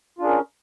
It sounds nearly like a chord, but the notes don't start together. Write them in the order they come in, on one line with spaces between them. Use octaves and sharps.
F4 D4 G#4 A#4 C#4